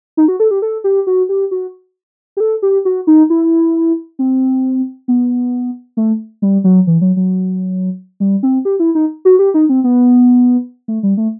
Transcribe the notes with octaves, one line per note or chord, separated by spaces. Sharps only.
D#4
F#4
A4
G4
A4
G4
F#4
G4
F#4
G4
A4
G4
F#4
D#4
E4
C4
B3
A3
G3
F#3
E3
F#3
F#3
G3
C4
G4
E4
D#4
F#4
G4
D#4
C4
B3
A3
G3
A3